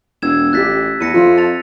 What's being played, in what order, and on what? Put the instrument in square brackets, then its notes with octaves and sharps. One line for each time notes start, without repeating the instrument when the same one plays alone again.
[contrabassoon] E1 [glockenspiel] E6 G#6 E7
[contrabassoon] A1 [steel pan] F4 G4 [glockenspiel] F#6 A6 B6
[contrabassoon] E2 [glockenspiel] A#6 C#7 D#7
[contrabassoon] F2 [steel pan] E4 F4
[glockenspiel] A5 A6 F7